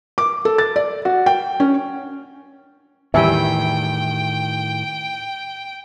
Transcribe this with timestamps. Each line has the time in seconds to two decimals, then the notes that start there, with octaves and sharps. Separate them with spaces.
0.18 D6
0.45 A4
0.58 A6
0.76 D5
1.05 F#4
1.26 G5
1.60 C#4
3.14 E2 A2 D#3 G3 E5 G5 G#5